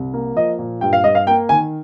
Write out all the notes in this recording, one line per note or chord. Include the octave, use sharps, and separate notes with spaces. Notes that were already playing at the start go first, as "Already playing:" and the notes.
Already playing: C2
A#3
F3 D#5
A#2
G2 G5
F5
G2 D#5
F5
A#3 G5
D#3 G#5